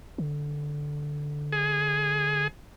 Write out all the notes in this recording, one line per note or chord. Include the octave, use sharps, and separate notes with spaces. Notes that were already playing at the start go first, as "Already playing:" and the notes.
D3
G#4